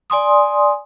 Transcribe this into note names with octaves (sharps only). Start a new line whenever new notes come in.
D5 G#5 C6 D#6